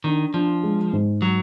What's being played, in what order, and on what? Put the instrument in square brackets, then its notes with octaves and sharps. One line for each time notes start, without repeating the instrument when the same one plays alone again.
[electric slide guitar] D#3 [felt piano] D4
[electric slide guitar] F3 [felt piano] D4
[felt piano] G#3
G#2
[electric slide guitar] F#3